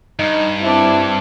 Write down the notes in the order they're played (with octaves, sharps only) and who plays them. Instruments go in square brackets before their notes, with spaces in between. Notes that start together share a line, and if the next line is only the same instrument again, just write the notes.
[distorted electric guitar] G2 [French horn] D#4
[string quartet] C4 D4 [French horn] E4